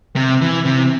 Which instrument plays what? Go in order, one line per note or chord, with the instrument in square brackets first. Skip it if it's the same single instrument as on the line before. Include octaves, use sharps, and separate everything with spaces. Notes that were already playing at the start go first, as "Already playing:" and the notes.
[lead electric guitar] C3
E3
C3